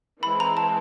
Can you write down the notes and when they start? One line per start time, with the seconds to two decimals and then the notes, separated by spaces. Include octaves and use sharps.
0.22 E3 G#3 C4 B5
0.40 A#5
0.57 A5